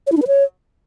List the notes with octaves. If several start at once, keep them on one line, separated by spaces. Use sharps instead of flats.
C#5
E4
D4
B4
C#5